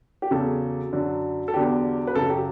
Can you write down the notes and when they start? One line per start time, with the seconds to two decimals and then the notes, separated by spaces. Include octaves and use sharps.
0.22 G4
0.31 E2 C#3 F#3 A4
0.93 F#2 D3 F#3
1.48 A4
1.54 E2 D3 F#3 G4
2.07 B4
2.14 F#2 C#3 F#3 A4
2.30 G4